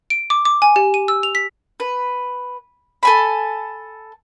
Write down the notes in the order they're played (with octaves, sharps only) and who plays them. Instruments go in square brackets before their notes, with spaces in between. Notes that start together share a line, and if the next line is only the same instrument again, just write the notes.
[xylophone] D7
D6
D6
G#5
G4
D#7
E6
F7
B6
[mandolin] B4
A4 G#5 B5